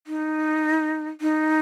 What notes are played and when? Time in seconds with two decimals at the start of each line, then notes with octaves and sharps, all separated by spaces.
0.07 D#4
1.21 D#4